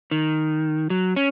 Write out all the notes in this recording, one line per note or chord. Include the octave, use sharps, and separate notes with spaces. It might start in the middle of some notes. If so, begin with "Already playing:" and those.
D#3
F#3
C#4